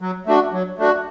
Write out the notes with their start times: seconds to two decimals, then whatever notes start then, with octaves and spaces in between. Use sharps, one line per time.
0.01 F#3
0.26 A3 D4 F#4
0.53 F#3
0.78 A3 D4 F#4